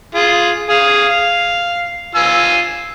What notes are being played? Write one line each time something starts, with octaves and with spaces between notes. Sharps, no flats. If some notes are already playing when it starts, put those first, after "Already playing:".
F4 G#4
G#4 F5
F5
F4 G#5 E6